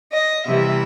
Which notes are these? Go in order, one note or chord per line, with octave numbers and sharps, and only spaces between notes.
D#5
C3 E3 G3 B3 E5